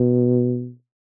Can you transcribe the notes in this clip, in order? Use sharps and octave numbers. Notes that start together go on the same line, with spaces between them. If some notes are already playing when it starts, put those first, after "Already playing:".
Already playing: B2